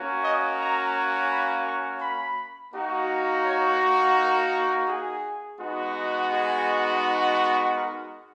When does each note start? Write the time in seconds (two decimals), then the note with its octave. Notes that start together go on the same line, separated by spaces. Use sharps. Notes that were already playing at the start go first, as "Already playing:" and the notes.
Already playing: A#3 C#4 F#4
0.23 D#5
0.58 A#5
1.30 B5
1.66 C#6
2.01 B5
2.73 A#3 D#4 F#4
3.45 C#5
4.16 A#4
4.88 G#4
5.59 G#3 B3 D#4 F#4
6.31 G#4
7.74 A#4